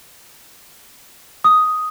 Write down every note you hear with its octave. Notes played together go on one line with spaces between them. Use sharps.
D#6